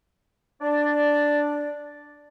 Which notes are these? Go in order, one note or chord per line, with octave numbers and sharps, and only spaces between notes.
D4 D5